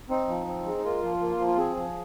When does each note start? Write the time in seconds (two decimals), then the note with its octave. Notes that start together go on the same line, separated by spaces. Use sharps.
0.10 C4 D#4
0.28 F3
0.47 C4
0.66 G#3
0.77 D#4
0.84 A#3 F4
1.03 F3
1.20 A#3
1.39 F3
1.47 F4
1.57 C4 G#4
1.76 F3